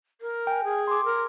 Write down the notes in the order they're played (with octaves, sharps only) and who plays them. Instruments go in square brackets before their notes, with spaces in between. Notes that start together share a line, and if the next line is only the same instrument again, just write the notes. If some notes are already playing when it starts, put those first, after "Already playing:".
[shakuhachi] A#4
[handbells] G5 G#5
[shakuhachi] G#4
[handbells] C6 D6
[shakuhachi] A#4